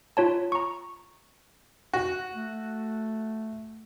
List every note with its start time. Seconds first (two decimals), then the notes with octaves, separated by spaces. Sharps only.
0.17 F4 C#5 A5
0.52 A#5 C#6
1.93 F#4
2.34 A3